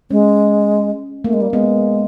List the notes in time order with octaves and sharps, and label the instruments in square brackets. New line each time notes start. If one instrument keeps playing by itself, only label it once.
[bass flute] G#3 [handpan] C#4
[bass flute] A3 [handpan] A#3
[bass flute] G#3
G3
[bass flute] G#3 [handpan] B3